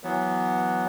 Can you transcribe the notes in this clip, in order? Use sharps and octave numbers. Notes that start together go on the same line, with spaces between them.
E3 F#3 B3